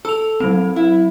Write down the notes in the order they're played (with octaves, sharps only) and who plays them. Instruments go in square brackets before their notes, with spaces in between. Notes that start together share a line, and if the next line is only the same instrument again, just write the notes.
[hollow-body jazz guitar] A4 [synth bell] E6 F7
[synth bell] F#3 C4
[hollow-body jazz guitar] E4